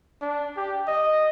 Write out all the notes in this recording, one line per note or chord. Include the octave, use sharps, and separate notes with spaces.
D4
G4
D#5